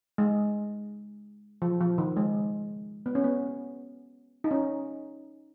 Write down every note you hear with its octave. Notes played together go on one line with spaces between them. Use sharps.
G#3
F3
F3
D#3
G#3
B3
C#4
B3
D#4
C#4